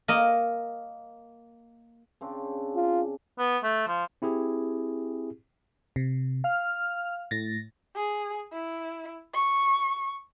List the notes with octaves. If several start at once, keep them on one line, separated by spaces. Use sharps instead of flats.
A#3 D#5
C#3 C4 D4
F4
B3
A3
F3
C4 E4 G4 G#4
C3
F5 F6
A2 A6 A#6
G#4
E4
C#6